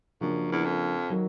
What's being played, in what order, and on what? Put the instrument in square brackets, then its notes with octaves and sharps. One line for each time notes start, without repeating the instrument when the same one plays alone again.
[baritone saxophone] F#2 [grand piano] C#3 F3 A#3 D4
[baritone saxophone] E2
F2
[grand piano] D#3 F#3